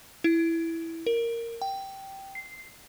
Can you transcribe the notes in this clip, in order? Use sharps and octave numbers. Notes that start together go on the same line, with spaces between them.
E4
A#4
G5
C7